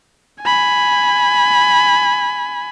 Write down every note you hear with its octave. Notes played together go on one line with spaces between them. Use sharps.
G#5 B5